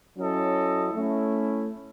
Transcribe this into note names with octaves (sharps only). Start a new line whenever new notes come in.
F#3 C#4 E4 A4 D#5
A3 C#4 E4